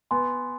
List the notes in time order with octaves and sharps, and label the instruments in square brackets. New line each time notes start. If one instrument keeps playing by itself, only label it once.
[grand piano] B3 [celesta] G#5 C6